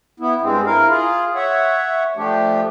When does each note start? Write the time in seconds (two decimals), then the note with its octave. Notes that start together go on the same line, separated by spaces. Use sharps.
0.20 B3 E4
0.41 G2 G#3 C4
0.66 E4 A#4 F5
0.89 F4 G#4
1.35 C#5 E5 F#5
2.17 F3 A3 D4 G4